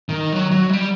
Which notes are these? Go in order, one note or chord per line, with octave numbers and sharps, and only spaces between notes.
D#3
F#3
F#3
G3